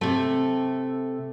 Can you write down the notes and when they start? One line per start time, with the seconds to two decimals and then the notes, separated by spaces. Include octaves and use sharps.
0.01 C3 A3 A4